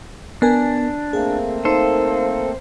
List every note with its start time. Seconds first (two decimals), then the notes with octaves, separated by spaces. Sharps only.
0.42 B3 D4 A#4 G#5
1.13 A3 A#3 C4 G#4
1.65 D#4 A4 C5